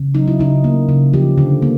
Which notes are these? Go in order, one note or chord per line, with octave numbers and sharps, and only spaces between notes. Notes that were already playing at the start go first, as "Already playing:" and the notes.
Already playing: C#3
F#3 D#4
E4
C#3 D#4
A#3
C#3
F3 G4
D3
A#3